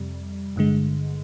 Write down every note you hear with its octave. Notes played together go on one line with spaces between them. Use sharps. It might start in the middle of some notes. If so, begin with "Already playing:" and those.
Already playing: F2 C3 G3
G1 G2 D3 G#3